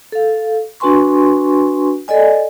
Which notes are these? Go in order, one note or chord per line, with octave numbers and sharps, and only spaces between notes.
A4 F5
D4 F#4 B4 G#5 C6 C#6
A4 D5 D#5 G#5